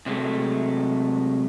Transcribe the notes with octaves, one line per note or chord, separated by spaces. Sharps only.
C3 F#3 G#3 A3